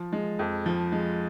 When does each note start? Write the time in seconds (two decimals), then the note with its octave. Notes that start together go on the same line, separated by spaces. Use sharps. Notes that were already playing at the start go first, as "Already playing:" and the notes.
Already playing: F3
0.12 G#3
0.39 F2
0.66 F3
0.92 G#3